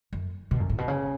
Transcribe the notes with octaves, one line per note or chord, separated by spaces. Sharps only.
F#2
B2
F#2
A2
B2
C#3